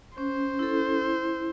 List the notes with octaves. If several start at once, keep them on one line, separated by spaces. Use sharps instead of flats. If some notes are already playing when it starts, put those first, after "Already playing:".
C#4 C5
E4 A4
E4